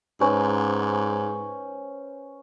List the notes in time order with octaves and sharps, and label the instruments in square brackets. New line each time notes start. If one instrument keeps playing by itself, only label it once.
[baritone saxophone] G#2 [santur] C#4 B4 C5